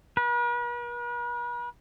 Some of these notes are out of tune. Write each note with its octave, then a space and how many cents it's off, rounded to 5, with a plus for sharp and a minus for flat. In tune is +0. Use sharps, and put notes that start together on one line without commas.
B4 -45